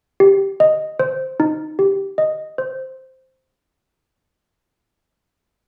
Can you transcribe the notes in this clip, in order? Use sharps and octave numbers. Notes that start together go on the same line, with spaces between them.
G4
D#5
C5
D#4
G4
D#5
C5